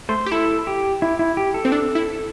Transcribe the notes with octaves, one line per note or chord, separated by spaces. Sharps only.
A3 C5
G4
E4 A4
G4
E4
E4
G4
A4
C4
D4
E4